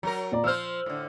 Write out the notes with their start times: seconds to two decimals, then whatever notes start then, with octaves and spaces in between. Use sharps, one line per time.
0.03 F#3 A#4 A#5
0.32 A#2 D5 A#5
0.44 F3 C5 E6 F6
0.86 A2 D3